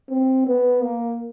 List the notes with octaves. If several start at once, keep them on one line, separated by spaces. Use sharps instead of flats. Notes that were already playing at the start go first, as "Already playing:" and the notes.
C4
B3
A#3